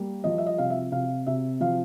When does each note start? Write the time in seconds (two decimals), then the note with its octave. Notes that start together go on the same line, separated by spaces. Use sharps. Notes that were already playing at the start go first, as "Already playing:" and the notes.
Already playing: G3 A#3
0.24 F3 D#5
0.38 E5
0.46 D#5
0.58 C3 F5
0.70 E5
0.92 C3 F5
1.27 C3 E5
1.60 F3 F5